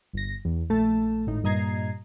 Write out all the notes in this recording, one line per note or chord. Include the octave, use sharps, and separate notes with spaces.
G1 A#6
E2
A#1 A3 A5
G#1 A2 D#4
G2 A#2 D#5 A#5 G#6 C7